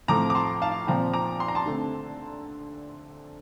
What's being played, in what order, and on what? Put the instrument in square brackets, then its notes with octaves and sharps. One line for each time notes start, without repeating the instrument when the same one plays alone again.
[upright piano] A2 F3 A3 C4 A#5 D6
D6
A5 C6
F5 A5
A#2 F3 C4 G5 A#5
A#5 D6
C6
A#5
A5 C6
D3 A3 C4